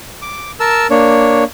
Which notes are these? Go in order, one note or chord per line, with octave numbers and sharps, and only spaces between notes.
D6
A#4 A5 E6
A#3 D4 C#5